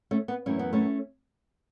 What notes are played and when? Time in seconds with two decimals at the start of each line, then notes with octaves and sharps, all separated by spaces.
0.11 A3 C#4
0.28 B3
0.46 F#2 E3 A3 C#4
0.59 B3
0.73 A3 C#4